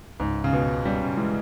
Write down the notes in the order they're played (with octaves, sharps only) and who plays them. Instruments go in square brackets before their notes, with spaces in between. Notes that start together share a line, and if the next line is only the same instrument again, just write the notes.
[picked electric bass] C#2 [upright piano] G#2
[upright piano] C#3
[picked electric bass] C#2 [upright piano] B2
[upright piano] G3 [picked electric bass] C#4
[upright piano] E3 [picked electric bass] G#3